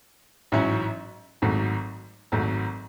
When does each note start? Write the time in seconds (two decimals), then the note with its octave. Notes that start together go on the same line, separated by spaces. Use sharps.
0.52 A1 G#2 F#3 C#4 E4
1.42 G#1 G#2 F#3 A3
2.32 G#1 G#2 F#3 A3